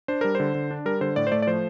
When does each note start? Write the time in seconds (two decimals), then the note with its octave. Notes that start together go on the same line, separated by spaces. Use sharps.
0.08 D4 C5
0.21 G3 A#4
0.35 D3 C5
0.55 D3
0.71 D4
0.85 G3 A#4
1.01 D3 C5
1.16 A2 D5
1.27 C5
1.32 A3 D5
1.42 D5
1.47 F3 C5